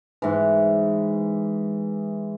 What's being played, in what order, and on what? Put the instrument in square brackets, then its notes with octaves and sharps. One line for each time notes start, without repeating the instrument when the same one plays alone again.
[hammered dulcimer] G#2 E3